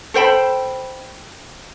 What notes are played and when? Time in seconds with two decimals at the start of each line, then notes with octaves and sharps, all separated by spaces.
0.14 A4 C5 G5 B5